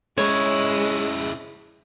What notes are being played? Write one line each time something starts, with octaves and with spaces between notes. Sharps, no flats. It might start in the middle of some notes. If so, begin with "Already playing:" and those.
C#3 G#3 E4 C#5